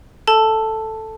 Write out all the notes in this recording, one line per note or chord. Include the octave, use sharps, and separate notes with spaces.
A4 A5